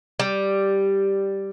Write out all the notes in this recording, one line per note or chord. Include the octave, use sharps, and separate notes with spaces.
G3